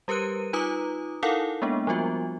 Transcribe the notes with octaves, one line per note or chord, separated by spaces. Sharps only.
G3 G4 A#4 B4 F#6 D#7
D#4 F4 B4 A#5 D6 D#6
D#4 E4 A4 A#4 F5 F#5
G#3 A#3 B3 D4
F3 G3 B3 F4 F#4